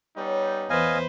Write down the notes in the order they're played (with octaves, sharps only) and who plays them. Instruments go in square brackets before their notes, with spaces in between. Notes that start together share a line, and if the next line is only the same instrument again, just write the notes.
[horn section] G3 B3 D#4 [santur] C#4 C#5
[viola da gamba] E2 B4 C5 [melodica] D#5 F5 G#5